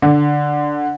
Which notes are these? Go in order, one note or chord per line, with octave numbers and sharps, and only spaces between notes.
D3